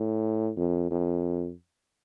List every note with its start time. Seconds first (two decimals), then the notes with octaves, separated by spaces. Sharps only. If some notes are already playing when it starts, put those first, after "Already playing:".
Already playing: A2
0.57 F2
0.91 F2